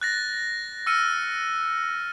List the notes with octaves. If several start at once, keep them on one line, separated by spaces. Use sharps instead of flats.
F#6 A6 A#6
E6 F6 C#7 D#7